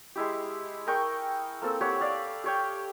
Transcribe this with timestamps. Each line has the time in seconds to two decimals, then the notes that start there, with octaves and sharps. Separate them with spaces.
0.16 G#3 E4 G4
0.87 G#4 A#4 G5 C#6
1.62 A#3 C4 A4
1.81 G4 C#5 F#5 B5
2.00 G4 D5 F5
2.44 G4 C#5 G5